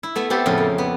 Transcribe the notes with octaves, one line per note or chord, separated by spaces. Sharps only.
E4
A3 B3 E5
B3 C4 G4 A4 B4
F2 A2 C#3 A4 B4
A#3
B3